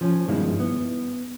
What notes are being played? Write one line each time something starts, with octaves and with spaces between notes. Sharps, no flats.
F3 C#4
G2 B2 D#3 G#3 E4
B3